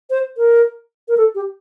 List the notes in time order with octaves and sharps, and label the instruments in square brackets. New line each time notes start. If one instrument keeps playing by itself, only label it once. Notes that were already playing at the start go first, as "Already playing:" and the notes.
[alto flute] C5
A#4
A#4
A4
G4